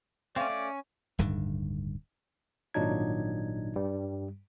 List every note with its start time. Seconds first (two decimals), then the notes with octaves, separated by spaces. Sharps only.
0.36 A3 C4 C#4 D5 F5
0.50 C#4
1.19 D1 G2 D3 D#3
2.74 G#1 A#2 F#3 D4 D#4 G#6
3.76 G2 G3